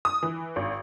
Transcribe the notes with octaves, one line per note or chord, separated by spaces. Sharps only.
D#6
E3
G#1